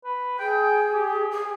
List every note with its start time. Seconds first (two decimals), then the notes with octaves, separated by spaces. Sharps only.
0.04 B4
0.39 G#4 G5
0.93 G4
1.31 G#4